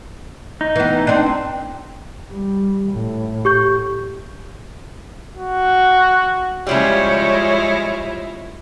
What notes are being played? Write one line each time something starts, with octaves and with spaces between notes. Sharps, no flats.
D#4
E3 B3
C4 D4
G3
A2
G4 C#6 G6
F#4
C#3 F3 G3 G#3 E4 F4 C#5